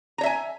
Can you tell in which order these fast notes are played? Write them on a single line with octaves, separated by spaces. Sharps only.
A#5 C#5 E5 G#5